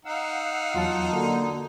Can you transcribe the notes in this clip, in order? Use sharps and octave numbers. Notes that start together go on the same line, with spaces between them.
D#4 F5 F#5 E6
E2 F#3 F4 A5
D3 A#3 F#4